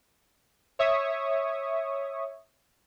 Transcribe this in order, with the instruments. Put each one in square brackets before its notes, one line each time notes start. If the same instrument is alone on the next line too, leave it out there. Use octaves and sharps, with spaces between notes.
[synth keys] C#5 E5 C#6 D#6